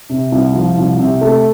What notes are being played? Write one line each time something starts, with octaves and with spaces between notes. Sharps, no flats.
C3
C2
F3
C2
C3
A3